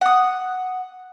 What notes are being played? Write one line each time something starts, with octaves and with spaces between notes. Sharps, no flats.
F#5 D#6